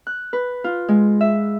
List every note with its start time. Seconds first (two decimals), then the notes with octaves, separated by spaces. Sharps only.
0.07 F#6
0.33 B4
0.64 F4
0.88 G#3
1.21 E5